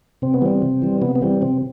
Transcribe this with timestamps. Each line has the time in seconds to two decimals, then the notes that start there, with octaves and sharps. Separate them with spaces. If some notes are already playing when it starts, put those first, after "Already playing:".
0.22 C3 C4
0.34 B3
0.42 E3 G3 C4
0.62 C3
0.82 E3 G3
1.02 C3 B3
1.16 B3
1.22 E3 G3 C4
1.41 C3 C4